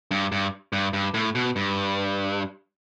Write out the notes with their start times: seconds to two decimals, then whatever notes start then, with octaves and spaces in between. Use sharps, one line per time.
0.11 G2
0.32 G2
0.73 G2
0.93 G2
1.14 A2
1.35 B2
1.56 G2